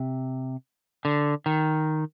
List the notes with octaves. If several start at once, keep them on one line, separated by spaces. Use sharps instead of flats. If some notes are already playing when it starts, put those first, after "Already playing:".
Already playing: C3
D3
D#3